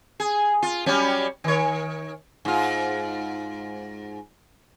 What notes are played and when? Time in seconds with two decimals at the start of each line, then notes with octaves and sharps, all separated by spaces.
0.20 G#4
0.62 F4
0.86 F#3 G3 C#4
1.44 D#3 C#5
2.45 G#2 F4